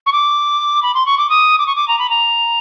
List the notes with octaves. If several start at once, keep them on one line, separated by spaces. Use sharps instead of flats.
C#6
D6
B5
C6
C#6
D6
D#6
D6
C#6
D6
A#5
B5
A#5